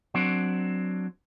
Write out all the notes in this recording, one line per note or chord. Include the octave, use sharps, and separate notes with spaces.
F#3 C4 D4